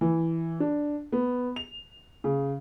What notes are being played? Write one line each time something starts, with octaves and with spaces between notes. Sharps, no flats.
E3
D4
B3
F7
C#3